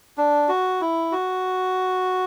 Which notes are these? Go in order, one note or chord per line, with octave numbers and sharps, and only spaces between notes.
D4
F#4
E4
F#4